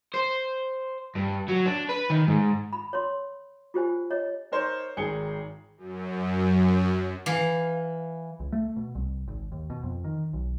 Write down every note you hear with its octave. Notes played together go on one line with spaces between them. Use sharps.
C5
G2
F#3
D4
B4
D#3
G#2
B5
C#5 C6
F4 G4 C5 G#5
C#5 D#5
D#4 A#4 C5 C#5
G#1 D#3 G#4 G5 C#7 G7
F#2
E3 F5
C#2
A3
B2
C2
G#1
D#2
B2
F2
D#3
B1